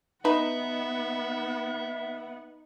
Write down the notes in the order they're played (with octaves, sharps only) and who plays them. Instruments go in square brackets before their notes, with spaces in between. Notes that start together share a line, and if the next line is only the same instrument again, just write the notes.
[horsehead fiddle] B3 F#5 [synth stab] D#4 [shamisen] B4 [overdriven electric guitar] E5